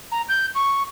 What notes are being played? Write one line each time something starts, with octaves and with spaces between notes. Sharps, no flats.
A#5
G6
C#6